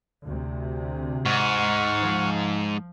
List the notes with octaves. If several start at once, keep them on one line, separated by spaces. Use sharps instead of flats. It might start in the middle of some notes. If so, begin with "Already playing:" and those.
D2 C3
G#2 F#5 C#6 F6
F3